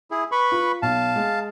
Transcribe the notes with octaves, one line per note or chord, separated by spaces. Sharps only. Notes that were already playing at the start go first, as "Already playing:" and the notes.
E4 G#4
B4 B5 C#6
F4
B1 F5 A5
G#3